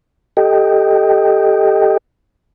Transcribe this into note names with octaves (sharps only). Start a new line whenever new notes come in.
G4 A4 D#5 G5